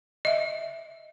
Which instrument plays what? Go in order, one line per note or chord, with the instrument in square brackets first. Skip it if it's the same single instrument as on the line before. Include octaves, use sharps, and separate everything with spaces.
[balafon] D#5 E5